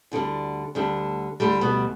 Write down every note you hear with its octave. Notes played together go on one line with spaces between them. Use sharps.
D2 D3 G3
D2 D3 G3
D2 D3 G3 A3
B2 B3